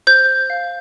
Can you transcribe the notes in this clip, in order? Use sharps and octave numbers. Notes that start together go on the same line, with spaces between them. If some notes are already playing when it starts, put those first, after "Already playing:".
C5 G6
F5